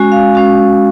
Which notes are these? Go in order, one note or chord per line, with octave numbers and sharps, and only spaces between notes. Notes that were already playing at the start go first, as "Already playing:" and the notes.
Already playing: G#3 C#4 F#4 G#5
F5
G#3 C#4 F#4